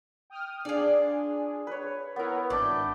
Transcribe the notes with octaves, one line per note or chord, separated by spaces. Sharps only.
G5 D#6 F6
D4 F4 G#4 D5
B4 C#5
B3 E4 A#4 B4 C#5
G#1 D4 E4 D5 G6